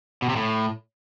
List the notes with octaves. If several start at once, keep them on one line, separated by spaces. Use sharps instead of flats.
B2
C3
A2